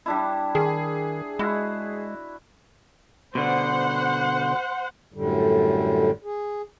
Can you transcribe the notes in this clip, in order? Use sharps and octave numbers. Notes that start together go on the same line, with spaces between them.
G3 D4 E4
D#3 G#4
G#3 E4 F#4
B2 D3 C5 F#5
F#2 A2 D3 G3
G#4